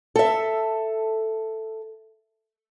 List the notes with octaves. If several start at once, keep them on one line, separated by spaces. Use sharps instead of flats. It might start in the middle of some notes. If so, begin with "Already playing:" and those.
A4 E5